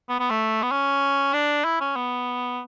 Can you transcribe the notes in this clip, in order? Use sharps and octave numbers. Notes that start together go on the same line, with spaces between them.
B3
B3
A3
B3
C#4
D4
E4
C#4
B3